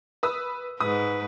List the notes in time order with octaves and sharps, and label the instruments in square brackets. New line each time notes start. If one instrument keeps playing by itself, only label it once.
[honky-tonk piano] B4 D#6 E6
[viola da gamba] G#2 B4 [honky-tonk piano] D#6